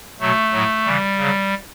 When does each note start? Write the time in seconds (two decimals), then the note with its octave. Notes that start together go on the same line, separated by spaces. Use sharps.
0.20 B2 F#3 A3
0.52 A2 F#3
0.85 C#3 E3 G3
1.18 C#3 F#3